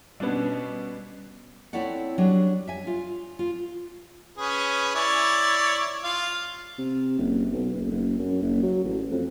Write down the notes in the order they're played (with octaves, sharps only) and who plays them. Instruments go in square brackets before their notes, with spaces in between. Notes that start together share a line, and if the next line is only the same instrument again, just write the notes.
[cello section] B2 [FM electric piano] G3 C#4 [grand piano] B3 D4
[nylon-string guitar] C4 E4 A4 C#5 D5 F#5
F#3 G3 D4
E5 G#5
F4
F4
[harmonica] C#4 G#4 B4
E4 C#5 D5
F4 F5
[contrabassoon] C3
F#1
B1
F#1
F#1
F#2
F#1
F#3
A1
F2